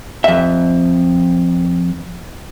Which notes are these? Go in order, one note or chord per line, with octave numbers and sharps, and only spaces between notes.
F2 E5